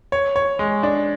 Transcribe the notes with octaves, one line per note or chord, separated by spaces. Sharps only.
C#5
C#5
G#3
D4